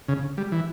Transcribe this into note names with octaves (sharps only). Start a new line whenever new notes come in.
C#3
G3
E3